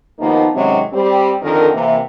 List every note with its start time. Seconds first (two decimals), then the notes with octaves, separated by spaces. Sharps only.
0.20 D#2 F3 A#3 B3 D#4
0.54 C3 D#3 F#3 G#3 C4 C#4
0.93 G3 C4 G4
1.42 F2 D3 D#3 A#4
1.74 C3 E3 A#3